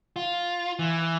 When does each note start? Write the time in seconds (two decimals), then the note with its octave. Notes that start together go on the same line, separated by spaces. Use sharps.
0.16 F4
0.79 E3